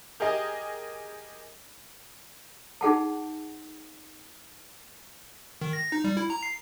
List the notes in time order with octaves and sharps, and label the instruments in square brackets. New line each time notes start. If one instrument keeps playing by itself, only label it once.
[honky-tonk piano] G4 G#4 A#4 D#5
[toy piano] D#4 G#4 F#5 A5
[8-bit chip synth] D#3
A#6
D#4
G3
E4
A#5
C7